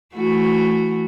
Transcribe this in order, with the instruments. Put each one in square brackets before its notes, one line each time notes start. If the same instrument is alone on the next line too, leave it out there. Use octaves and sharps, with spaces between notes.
[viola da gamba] E3 A3 F#4